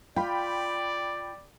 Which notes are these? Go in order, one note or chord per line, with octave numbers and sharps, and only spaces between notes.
F4 D5 G5 B5